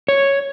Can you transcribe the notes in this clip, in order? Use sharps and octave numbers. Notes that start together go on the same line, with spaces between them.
C#5